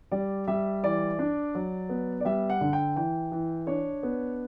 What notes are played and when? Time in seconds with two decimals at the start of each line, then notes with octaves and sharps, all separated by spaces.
0.11 G3 D5
0.47 G3 E5
0.83 E3 D5
1.19 D4
1.55 F#3
1.89 B3
2.21 D5
2.25 G3 E5
2.50 F#5
2.61 D3
2.73 G5
2.96 E3 G5
3.32 E3
3.67 D4 C#5
4.03 B3